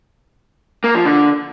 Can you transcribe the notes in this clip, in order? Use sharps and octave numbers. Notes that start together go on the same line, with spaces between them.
A#3
F3
D3